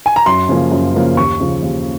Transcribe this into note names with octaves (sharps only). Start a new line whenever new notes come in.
G#5
A#5
F#2 C6
C#3 F3 A#3 C#4
F#2
C#3 F3 A#3 C#4
D#2 C#6
C#3 F3
D#2